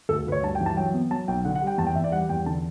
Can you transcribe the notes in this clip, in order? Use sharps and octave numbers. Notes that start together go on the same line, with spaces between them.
D2 A4
D2 B4
C#5
G2 A5
G5
E3
A5
F#3 G5
B3
F#3 A5
B1 G5
D3 F#5
F#5
G3 G5
E2 A5
G5
E2 E5
D5
G3 F#5
E2 G5
D3 A5